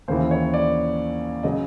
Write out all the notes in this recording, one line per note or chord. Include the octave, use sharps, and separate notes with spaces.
D#2 C#3 E3 C5
C#5
D5
C#3 F#3 D#5